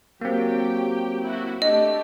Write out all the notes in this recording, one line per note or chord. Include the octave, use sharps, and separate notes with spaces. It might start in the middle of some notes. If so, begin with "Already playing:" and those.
F#3 A#3 C4 G4 G5
E4 F#4
A3 D4 G4 D#5